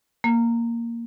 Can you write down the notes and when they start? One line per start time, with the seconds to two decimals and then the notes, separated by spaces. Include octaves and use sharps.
0.24 A#3